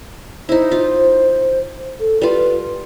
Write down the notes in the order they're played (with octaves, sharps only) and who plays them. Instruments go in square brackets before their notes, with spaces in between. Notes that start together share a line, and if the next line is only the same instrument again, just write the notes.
[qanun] D#4 E4 [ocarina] C5
[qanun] F4
[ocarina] A4
[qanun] G3 F4 [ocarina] B4